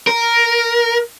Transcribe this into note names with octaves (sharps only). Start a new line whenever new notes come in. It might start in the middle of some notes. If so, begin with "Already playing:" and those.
A#4